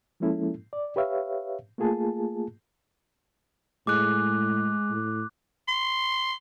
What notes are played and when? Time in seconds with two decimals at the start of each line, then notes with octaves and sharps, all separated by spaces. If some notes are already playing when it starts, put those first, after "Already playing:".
0.20 F3 G#3 A#3 C#4 E4 A4
0.73 D5
0.96 G4 B4 C#5 E5 F5
1.78 A3 A#3 F4 G#4 A5
3.87 A2 G#3 D6 F#6
4.90 A2
5.68 C6